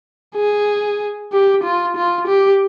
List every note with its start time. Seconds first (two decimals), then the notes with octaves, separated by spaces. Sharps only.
0.36 G#4
1.32 G4
1.63 F4
1.96 F4
2.27 G4